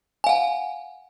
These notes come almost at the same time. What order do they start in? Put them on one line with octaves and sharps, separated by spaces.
G#5 F5 F#5